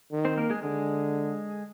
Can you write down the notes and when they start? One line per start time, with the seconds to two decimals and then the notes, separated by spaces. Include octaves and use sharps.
0.11 D#3
0.25 C4 C5
0.38 A#3 A#4
0.50 G#3 G#4
0.63 D3 G#3 G#4